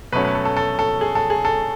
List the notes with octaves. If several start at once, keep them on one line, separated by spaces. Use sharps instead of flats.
B2 F#3 A3 C#4 B4
B4
A4
A4
A4
A4
G#4
A4
G#4
A4